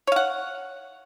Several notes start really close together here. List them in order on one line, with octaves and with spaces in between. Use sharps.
C#5 F5 F#5